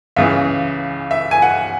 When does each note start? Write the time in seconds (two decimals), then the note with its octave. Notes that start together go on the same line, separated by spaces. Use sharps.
0.16 C#2 C#3 E3 E5
1.11 E5
1.31 G#5
1.42 F#5